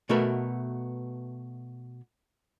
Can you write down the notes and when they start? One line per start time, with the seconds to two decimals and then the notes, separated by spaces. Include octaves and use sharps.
0.09 B2 A3 F#4 A#4 B4 E5